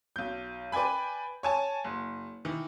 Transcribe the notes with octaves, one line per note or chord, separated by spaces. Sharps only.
B1 G6
B4 D5 G5 G#5 B5
C#5 G#5 A5
F#1
D#3 E3